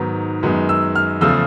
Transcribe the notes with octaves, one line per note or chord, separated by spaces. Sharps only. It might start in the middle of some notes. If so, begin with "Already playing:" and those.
Already playing: G#2 D#3 F#3 B3
F#2 D#3 G#3 B3
E6
F6
E2 C#3 F3 A3 E6